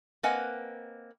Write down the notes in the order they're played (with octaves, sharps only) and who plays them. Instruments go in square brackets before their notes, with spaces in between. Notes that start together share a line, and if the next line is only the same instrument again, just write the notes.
[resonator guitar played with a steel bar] A#3 C4 B4 D#5 F#5 G#5